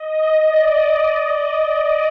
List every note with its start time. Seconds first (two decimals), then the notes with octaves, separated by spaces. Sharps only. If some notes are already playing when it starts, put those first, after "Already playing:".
Already playing: D#5
0.42 D5